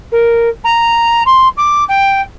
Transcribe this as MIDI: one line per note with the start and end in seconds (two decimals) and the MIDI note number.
0.11 0.49 70
0.64 1.22 82
1.26 1.48 84
1.57 1.84 86
1.88 2.21 79